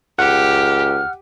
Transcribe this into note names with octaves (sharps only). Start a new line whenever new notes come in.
C#2 G4 F#5 F6